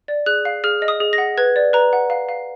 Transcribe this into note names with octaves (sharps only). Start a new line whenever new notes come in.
D5
G#4 F#6
F5
G#4 F6
D#5
D#6
G#4
A#6
F#5
B4 G#6
D5
B4 A#5
F#5
F5
F5